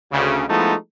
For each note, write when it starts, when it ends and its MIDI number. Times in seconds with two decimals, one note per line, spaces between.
0.12 0.44 38
0.12 0.44 49
0.48 0.74 53
0.48 0.74 56
0.48 0.74 57
0.48 0.74 59
0.48 0.74 63
0.48 0.74 64